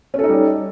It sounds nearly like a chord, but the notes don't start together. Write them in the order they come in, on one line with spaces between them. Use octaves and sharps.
C#4 A4 D#4 G3